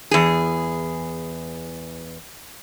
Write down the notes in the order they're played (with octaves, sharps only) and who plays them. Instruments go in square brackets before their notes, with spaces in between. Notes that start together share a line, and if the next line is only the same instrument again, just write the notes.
[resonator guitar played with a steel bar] E2 G#4